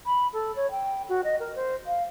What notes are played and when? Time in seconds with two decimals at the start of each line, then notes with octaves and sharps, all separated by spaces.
0.06 B5
0.33 A4
0.55 C#5
0.71 G5
1.09 F#4
1.24 D#5
1.39 A#4
1.55 C5
1.86 F5